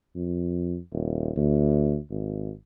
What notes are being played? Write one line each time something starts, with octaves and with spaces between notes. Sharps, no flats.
F2
D#1
D2
G#1